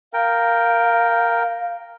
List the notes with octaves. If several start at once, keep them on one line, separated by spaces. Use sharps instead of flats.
A#4 F5 G5